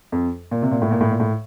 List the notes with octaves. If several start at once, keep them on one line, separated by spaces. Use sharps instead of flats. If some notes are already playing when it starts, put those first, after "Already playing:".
F2
A#2
C3
A#2
A2
A#2
A2
A#2
A2